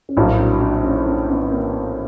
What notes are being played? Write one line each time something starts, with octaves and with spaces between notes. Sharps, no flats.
C#4
A#1 A2 F#3 A#3 C4 D4
D4 E4
D4 E4
C#4 D#4
C4 D4
B3 C#4
A#3 C4